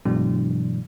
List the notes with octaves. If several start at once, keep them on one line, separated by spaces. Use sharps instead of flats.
G2 B2 E3 F#3 G#3 D4